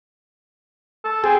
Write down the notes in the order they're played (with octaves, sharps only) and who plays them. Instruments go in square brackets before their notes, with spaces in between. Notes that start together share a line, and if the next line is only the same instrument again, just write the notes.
[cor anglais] A4
[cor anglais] C4 [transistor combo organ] G#4